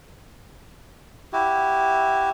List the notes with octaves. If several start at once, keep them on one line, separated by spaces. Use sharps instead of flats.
E4 F#4 G4